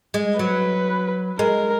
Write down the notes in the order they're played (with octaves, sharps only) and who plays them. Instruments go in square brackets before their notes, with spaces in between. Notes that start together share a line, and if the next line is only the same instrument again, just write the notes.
[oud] G#3
[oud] F#3 [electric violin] B4
[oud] G#3 [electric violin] A#4